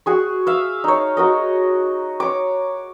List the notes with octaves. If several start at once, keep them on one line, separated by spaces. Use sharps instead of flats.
F#4 G#4 C#6
E5 F5
D#4 C#5
F#4 A#4 D#5
C#5 D6